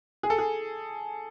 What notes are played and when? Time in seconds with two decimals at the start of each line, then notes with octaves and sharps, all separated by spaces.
0.23 G#4
0.30 A4
0.38 G#4